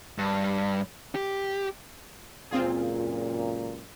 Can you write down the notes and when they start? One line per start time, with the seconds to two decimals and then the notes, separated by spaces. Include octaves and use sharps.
0.18 G2
1.15 G4
2.51 C#2 F#2 A#2 C4 F4 G#4